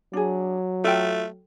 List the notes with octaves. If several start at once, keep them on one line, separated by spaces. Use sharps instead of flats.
F#3 D4 G#4
A3 F4 A4 G5